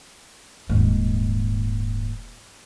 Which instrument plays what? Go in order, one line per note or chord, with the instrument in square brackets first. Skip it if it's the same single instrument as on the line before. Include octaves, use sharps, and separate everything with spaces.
[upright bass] D#1 G#2